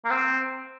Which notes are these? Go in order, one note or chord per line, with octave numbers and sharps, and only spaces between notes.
A#3
C4